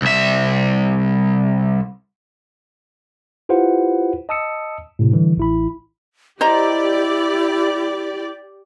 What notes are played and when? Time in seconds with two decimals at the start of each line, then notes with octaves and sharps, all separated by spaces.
0.02 C2 E5
3.49 E4 F4 G4 B4 C5 F#5
4.29 D#5 A5 D#6 E6 C#7
4.99 A2 C3
5.12 D3 E3 G3
5.37 A1 E4 B5
6.41 E4 G4 C5 D5 D#5 A#5